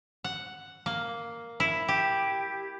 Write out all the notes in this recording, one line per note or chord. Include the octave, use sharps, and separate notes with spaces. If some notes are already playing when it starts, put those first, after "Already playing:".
F#5
A#3
E4
G4